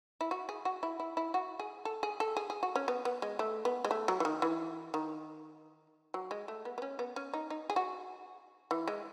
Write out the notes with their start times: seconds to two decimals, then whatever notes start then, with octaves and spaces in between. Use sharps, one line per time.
0.21 E4
0.31 F#4
0.49 G#4
0.65 F#4
0.83 E4
1.00 E4
1.17 E4
1.34 F#4
1.59 G#4
1.85 A4
2.03 G#4
2.20 A4
2.37 G#4
2.50 G#4
2.63 F#4
2.76 C#4
2.88 B3
3.05 B3
3.22 G#3
3.39 A3
3.65 B3
3.85 G#3
3.91 A3
4.08 F#3
4.20 E3
4.25 D#3
4.42 E3
4.94 D#3
6.14 F#3
6.31 G#3
6.48 A3
6.65 B3
6.78 B3
6.82 C#4
6.99 B3
7.16 C#4
7.34 D#4
7.50 D#4
7.70 G#4
7.76 F#4
8.71 E3
8.88 G#3